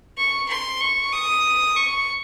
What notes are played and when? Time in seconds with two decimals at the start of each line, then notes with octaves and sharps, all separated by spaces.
0.17 C#6
0.49 C6
0.80 C#6
1.13 D#6
1.76 C#6